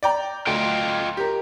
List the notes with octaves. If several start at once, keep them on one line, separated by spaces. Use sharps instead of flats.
D5 G5 A#5
D2 F4 D#5 G5
G4 A#4